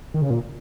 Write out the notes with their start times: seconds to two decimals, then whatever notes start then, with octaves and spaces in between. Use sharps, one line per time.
0.14 D#3
0.22 C#3
0.30 A#2